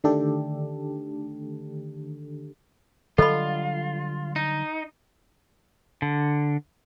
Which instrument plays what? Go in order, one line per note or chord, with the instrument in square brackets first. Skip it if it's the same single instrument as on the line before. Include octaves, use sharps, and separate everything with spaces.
[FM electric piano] D3 D#3 A3 D4 G4 A4
[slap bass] D3 F#3 G3 [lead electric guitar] F4 [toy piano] A4 D#5 B5
[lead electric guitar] D#4
[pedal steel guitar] D3